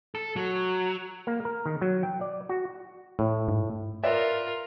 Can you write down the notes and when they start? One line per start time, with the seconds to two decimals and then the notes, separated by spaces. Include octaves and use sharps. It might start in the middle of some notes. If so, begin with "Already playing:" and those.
0.15 A4
0.36 F#3
1.27 A#3
1.45 A#4
1.66 D#3
1.81 F#3
2.03 G5
2.21 D5
2.49 F#4
3.19 A2
3.48 G#2
4.03 F4 A#4 B4 D5 E5